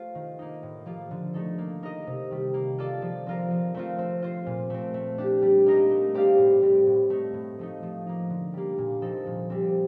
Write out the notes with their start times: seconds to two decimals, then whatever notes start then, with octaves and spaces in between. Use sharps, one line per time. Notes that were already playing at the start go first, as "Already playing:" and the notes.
Already playing: A3 F4 C5
0.15 D#3
0.39 A#3 D#4
0.63 A2
0.86 F3 A#3 F4
1.11 D3
1.34 A3 D#4 A4
1.58 A#3
1.83 D#4 A#4 D#5
2.07 C3
2.31 D#3 G3
2.54 A#3
2.78 F4 A4 D5
3.02 F3
3.26 C4 F4 A#4
3.50 F3
3.74 A3 C4 F4
3.98 C4
4.22 F4 C5
4.46 A#2
4.70 A3 C4
4.94 A3
5.18 D4 G4
5.42 G3
5.66 A#3 D#4 A#4 D#5
5.90 A3
6.14 C4 G4 D5 F5
6.38 A2
6.62 G3 C4
6.86 A2
7.10 A3 D#4
7.34 A2
7.59 F3 A3 D#4
7.83 F3
8.07 A#3 D#4
8.30 D3
8.54 G3 A#3
8.78 A#2
9.02 F3 C4 D#4 A4
9.27 A#2
9.50 G3 C4